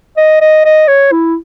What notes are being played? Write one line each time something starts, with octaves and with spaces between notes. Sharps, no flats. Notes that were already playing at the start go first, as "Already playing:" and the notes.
D#5
D#5
D#5
C#5
E4